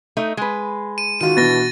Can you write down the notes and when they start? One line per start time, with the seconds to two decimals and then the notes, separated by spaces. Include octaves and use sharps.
0.17 A3 D#4
0.37 G#3 B4
0.98 D#7
1.21 D#3 F4 F#4 D#7
1.37 B2 E3 D4 A6 A#6